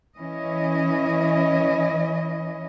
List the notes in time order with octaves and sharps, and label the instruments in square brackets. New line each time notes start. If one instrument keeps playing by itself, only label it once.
[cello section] E3 C#4 E4 D#5